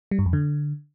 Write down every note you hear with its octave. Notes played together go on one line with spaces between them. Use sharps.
G3
G2
F2
D3